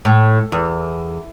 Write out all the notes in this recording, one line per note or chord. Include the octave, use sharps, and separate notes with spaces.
A2
E2